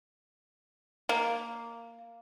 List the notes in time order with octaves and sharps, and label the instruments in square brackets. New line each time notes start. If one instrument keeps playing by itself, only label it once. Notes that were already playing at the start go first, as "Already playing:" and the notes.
[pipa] A#3